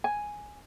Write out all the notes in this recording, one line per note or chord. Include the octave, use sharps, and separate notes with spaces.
G#5